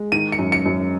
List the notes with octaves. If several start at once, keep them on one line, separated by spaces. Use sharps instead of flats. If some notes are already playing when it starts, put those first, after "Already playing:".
Already playing: G#3
D#3 D#7
C#7
F#2
C#7
F#2